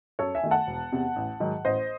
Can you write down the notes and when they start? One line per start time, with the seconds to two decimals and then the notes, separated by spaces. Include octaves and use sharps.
0.19 F#2 A4 C#5
0.35 E5 G#5
0.43 D#3 A3
0.51 F#5 A5
0.67 E1
0.92 E2 C3
1.16 A1
1.40 G#2 D#3 F#3
1.65 A1 C5 D#5